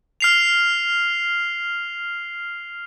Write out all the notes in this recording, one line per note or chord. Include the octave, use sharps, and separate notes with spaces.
F6 C7 F7